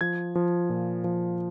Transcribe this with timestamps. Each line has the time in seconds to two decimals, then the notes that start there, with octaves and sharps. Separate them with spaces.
0.01 F3 G#6
0.35 F3
0.70 A#2
1.04 F3